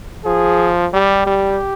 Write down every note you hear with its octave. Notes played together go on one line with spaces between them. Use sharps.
F3 G#4
G3 G4
G3